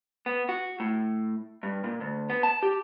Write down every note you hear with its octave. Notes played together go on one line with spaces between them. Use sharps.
B3
F#4
A2
G2
A#2
D2
B3
A5
G4